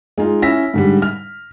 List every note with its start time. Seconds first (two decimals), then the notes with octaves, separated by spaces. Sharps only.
0.18 G#3 D#4 F4
0.42 C#4 E4 E6 A#6 B6
0.74 G#2 D3 G3
1.02 F6